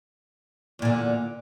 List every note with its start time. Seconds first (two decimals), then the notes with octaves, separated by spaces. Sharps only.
0.79 E2
0.82 A#2
0.85 D3